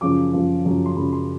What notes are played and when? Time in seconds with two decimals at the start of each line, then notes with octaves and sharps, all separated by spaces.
0.01 F#2 C#3 F3 D6
0.33 F#2 C#3 F3
0.64 F#2 C#3 F3
0.86 C6
0.96 F#2 C#3 F3 B5
1.13 C6